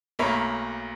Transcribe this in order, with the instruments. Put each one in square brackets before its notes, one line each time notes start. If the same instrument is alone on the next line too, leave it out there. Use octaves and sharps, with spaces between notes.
[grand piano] B1 A3 A#3 C#5 A#5 B5